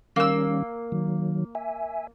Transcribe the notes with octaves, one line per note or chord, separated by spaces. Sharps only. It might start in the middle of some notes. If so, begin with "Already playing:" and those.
D#3 G3 A#3 C#4 E6
D#3 F#3
E5 G#5